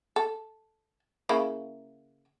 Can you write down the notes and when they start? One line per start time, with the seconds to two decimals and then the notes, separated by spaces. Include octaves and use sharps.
0.16 A4
1.29 C#3 A#3 E4